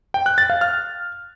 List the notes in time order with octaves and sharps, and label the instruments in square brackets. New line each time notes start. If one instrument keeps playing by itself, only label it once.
[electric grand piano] G5
F#6
A6
F5
F6